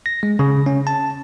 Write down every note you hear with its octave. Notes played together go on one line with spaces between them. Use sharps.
A#6
G#3
C#3
C#4
A5